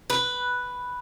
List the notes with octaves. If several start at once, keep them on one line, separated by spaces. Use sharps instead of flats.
B4